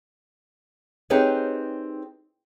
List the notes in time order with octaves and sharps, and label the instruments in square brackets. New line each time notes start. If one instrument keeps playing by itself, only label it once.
[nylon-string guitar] C4 D#4 G4 G#4 B4 C#5